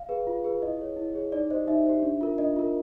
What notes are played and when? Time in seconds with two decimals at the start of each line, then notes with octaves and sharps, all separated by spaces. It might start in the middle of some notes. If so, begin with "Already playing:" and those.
Already playing: F5
0.09 G#4 B4
0.27 F4
0.44 G#4 B4
0.62 E4 D#5
0.79 G#4 C#5
0.97 E4
1.14 G#4 C#5
1.32 D#4 D5
1.50 G4 C5 D#5
1.67 D#4 E5
1.86 G4 C5
2.03 D4
2.21 F4 A#4
2.38 D4 D#5
2.56 F4 A#4